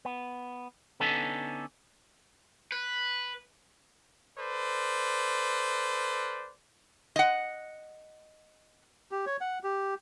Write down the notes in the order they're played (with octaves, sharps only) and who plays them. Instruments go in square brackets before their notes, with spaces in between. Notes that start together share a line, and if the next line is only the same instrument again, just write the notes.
[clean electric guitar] B3
D3 B3 C#4 D#4 A4
[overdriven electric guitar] B4
[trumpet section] A4 B4 C5 D5
[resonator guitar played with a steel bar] D#5 F#5
[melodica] G4
C#5
F#5
G4